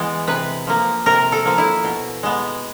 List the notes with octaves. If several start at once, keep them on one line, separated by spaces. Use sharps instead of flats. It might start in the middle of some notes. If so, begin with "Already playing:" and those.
Already playing: E3 G#3 B3
C3 B4
F3 A#3
C3 A#4
A4
F3 A#3
E4
B2
G#3 B3